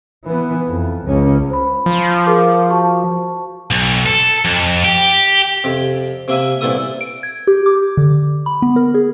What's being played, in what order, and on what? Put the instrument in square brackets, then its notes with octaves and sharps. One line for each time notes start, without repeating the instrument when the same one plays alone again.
[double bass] E3 B3
F2
C#2 C#4
[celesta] C5 B5
[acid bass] F3
[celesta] G#4 A#4 D6
F#4 A5 C#6
[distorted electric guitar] B1
A4
F2
G4
[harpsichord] F2 C3
C3 A#3 E5 G#5
C2 A#2 B3 E4 A4 D#6
[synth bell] D7
G#6
G4
D6
D3
B5
B3
A#4
G#4